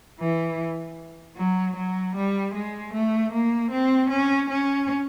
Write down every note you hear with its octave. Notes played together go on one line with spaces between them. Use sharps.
E3
F#3
F#3
G3
G#3
A3
A#3
C4
C#4
C#4